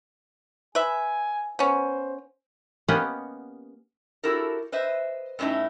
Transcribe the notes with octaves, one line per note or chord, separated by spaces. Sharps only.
B4 E5 G#5
B3 C#4 C5
A#3 B3 C#4 G4 D#5 F#5
E4 F#4 G4 A4 A#4
B4 C5 D#5 E5
G2 A3 C#4 D#4 E4